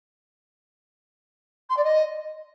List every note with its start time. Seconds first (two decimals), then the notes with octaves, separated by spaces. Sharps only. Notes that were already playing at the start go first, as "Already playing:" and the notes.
1.69 C6
1.77 D5
1.84 D#5